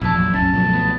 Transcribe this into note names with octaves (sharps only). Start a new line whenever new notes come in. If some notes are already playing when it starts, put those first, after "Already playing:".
A#1 F2 B2 E3 E4 A5
F#3
C#2 G2 C#4 A5
B2 F3 A3
B3